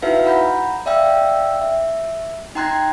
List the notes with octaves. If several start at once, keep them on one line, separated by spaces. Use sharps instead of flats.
D#4 E4 F#4 B4 E5 F5
F#5 A#5 B5 G6
D5 E5 F5 G5 E6
E5
D#4 G5 A#5 C6 F#6 G#6